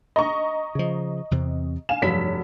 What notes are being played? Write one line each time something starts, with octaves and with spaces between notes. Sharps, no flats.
D#5 A#5 C#6
C#3 F3
E2 C3 C4
F5 G#5 E7
F1 G2 F#3 B6